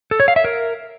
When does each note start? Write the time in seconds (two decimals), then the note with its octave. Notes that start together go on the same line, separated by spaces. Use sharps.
0.11 A4
0.20 C#5
0.28 F5
0.36 E5
0.45 A#4